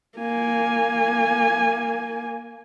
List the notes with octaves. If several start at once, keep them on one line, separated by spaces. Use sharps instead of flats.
A#3 G#5